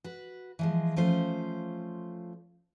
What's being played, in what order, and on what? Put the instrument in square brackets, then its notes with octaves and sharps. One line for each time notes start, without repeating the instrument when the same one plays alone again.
[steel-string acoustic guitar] F#4 B4
E3 F3 G#3
F3 A3 C#4 F4 C5